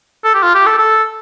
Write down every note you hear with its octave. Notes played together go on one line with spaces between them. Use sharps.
A4
G4
F4
G4
A4
A4